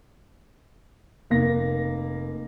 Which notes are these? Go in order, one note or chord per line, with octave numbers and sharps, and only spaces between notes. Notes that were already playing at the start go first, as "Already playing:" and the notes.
F1 A#3 A#6